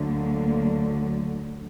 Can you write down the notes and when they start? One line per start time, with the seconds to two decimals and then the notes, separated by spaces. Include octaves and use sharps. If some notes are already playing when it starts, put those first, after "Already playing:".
Already playing: D2 D3 F#3 A#3